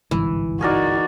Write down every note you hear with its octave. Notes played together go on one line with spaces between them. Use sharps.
G1 C2 G#2 E3
D#4 F#4 G#4 A#4 D5